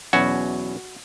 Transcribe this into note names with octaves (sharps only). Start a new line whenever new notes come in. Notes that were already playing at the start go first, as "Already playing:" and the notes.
E2 B2 F#3 C#4 F#4